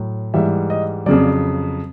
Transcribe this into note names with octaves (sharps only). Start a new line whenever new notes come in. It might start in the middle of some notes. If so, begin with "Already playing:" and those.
Already playing: A2 F#3
G#2 E3 G3 E5
D#5
F2 C#3 F#3 D5